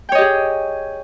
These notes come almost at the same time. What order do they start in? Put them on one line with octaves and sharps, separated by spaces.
G5 C#5 D#5 G4 G#4